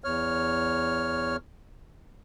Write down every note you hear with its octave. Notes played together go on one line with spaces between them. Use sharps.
E2 C#5 F6